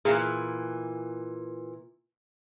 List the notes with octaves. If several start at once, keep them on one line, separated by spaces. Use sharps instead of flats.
A#2 E3 G#4